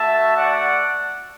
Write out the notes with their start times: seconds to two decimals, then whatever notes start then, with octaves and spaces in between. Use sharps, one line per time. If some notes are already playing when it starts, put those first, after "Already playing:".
Already playing: A3 F#4 E5 A5
0.35 D5 F#5